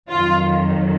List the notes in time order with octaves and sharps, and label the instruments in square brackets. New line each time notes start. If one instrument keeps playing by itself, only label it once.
[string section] F2 D#3 F#3 F4